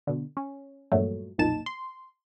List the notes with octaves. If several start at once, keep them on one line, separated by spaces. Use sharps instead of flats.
B2 D3
C#4
E2 G2 A#2 F#3 A3
B1 F2 A#2 D#4 A5 E7
C6